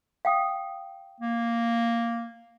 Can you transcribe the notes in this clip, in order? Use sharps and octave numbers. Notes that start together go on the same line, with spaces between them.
F5 G5 D#6
A#3